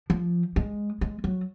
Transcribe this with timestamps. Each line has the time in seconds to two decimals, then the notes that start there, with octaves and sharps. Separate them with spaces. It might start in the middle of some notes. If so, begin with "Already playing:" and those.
0.10 F3
0.56 G#3
1.01 G#3
1.24 F#3